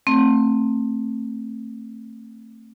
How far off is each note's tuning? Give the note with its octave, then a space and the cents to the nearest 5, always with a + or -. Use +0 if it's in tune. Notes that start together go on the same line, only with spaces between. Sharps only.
A3 +25 C4 +25